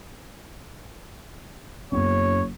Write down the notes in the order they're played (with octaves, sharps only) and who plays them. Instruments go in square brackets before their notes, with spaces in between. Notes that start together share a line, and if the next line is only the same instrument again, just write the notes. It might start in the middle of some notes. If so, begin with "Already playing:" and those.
[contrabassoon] F#1 [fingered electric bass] F#2 B3 C#4 [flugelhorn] C#5